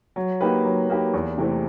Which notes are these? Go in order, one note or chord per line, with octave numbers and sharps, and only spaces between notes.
F#3
A#3 D#4 G4 B4
F#3
A#3 D#4 G4 B4
E2
C3 E3 A3 C4